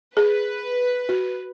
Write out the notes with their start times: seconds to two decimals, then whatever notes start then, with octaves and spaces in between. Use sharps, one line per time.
0.17 G#4 B4
1.09 F#4